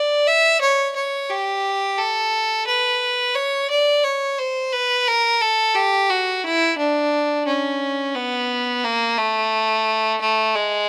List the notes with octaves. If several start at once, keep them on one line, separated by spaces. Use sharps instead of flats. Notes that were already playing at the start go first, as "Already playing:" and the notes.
Already playing: D5
E5
C#5
C#5
G4
A4
B4
C#5
D5
C#5
C5
B4
A#4
A4
G4
F#4
E4
D4
C#4
B3
A#3
A3
A3
G#3